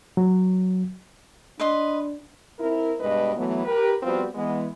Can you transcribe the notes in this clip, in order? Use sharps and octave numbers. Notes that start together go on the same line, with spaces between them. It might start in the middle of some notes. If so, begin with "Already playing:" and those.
F#3
D4 B4 D#5 C6
C4 E4 A#4
G2 B2 G#3 B4 D#5
E3 F#3 A3 B3
G4 A#4 B4
F3 G3 B3 C4 F4 F#4
E3 G#3 B3